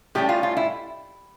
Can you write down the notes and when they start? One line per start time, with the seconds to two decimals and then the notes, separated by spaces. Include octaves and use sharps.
0.15 A2 G3 C#4 G4
0.29 F4
0.43 F4
0.57 E4